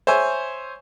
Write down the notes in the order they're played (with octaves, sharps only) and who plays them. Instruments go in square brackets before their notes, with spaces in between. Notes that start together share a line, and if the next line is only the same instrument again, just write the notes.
[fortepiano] C5 C#5 E5 G#5